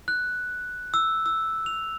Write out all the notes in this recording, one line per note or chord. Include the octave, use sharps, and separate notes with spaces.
F#6
E6
E6
F7